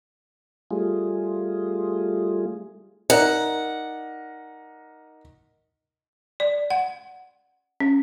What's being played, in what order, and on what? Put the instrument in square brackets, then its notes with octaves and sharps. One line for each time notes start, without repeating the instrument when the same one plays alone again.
[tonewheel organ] G3 A3 F4 G#4
[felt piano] D#4 A#4 D5 [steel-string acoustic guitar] F#5
[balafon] D5
F#5
C#4